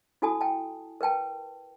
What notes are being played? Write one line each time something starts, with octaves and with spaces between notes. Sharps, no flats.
E4 F#4 A4 G#5 A5 D#6
G5 A5
A#4 B4 G5 A5